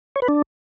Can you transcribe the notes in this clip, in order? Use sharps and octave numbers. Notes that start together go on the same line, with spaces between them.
C#5
B4
D4